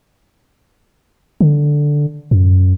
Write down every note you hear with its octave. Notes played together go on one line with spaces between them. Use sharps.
D3
F#2